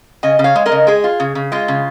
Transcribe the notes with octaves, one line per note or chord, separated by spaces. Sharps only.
C#3 D#5 G#5
C#3
C#5 F5
G#3
A#4 D#5
C#3
G#3 G#4
F4
C#3
C#3
G#3 F4
C#3